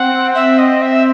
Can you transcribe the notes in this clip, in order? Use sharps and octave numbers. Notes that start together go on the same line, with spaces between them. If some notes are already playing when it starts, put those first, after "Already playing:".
Already playing: C4 F#5
E5
D#5
E5